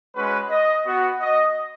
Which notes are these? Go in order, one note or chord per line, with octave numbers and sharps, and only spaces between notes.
G#3 C#4 F#4 B4
D#5
B3 F#4
D#5